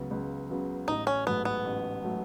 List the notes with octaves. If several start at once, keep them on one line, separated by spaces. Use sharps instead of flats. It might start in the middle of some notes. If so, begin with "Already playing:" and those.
Already playing: C#2 C#3 F#3 B3
C#2
C#3 F#3 B3
A1 D#4
C#4
G#2 F#3 A3 B3
B3
A1
F#3 A3